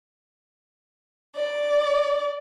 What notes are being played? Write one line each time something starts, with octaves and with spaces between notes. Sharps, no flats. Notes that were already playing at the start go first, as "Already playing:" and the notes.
D5